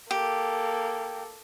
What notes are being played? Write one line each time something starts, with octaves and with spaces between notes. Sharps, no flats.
A#3 G4 A4